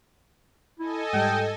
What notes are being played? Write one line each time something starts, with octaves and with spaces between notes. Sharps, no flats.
E4 A4 D#5 G#5
G#2 G3 G5